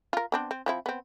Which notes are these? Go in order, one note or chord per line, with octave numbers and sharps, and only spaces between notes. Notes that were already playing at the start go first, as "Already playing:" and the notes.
F4 A#4
B3 C4 D4
C4
F3 C4 E4
B3 C4